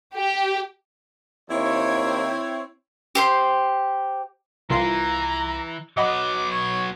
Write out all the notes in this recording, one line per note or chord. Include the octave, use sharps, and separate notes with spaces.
G4
D#2 C4 E4 C#5
G4 C5 C6
C2 E3 F4 A#5 C7
F#3 B3 D#5 F#5 B5 D6
C#5